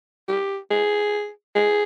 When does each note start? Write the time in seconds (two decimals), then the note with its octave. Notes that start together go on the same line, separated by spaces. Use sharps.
0.28 G4
0.70 G#4
1.55 G#4